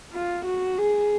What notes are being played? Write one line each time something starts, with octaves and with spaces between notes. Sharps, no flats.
F4
F#4
G#4